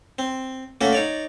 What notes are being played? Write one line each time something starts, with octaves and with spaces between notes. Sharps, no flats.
C4
A3 A#3 C#4 F#4
D#4 C#5 D5